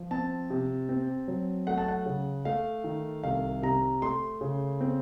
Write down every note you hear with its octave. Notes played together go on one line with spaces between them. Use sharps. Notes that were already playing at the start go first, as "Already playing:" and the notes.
Already playing: F3
C4 A5
C3
C4
F#3
A3 F#5
A5
F#5
C#3
A3 F5
D#3
C2 F5
C3 A#5
A3 C6
C#3
C4